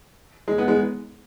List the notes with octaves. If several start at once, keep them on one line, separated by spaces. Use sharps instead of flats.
G#3
B3
G#3